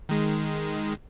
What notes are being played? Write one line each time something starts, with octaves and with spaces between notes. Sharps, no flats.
D#3 G#3